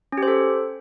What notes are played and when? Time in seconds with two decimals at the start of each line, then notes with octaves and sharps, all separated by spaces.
0.12 C#4
0.18 G4
0.23 C5
0.28 A4